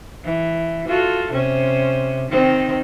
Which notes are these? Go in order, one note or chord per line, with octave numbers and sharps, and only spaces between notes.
E3
F4 F#4 A4
C3 C#4 C5
D#3 C4 D#4